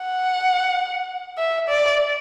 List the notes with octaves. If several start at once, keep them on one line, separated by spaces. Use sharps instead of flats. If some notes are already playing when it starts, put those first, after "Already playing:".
Already playing: F#5
E5
D5